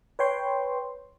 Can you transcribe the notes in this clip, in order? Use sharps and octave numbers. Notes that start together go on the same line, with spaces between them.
B4 C#5 G5 C6